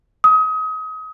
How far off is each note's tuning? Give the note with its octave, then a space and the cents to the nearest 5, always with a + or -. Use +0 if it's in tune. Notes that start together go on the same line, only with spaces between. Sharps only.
D#6 +30